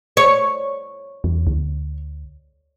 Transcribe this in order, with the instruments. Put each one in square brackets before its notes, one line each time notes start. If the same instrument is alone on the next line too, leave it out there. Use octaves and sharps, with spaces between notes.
[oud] C#5
[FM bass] E2
D2